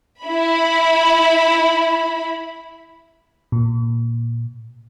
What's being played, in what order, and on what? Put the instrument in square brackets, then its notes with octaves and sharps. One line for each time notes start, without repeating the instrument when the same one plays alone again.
[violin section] E4 B5
[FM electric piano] A#2